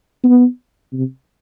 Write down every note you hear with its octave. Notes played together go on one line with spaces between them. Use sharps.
B3
C3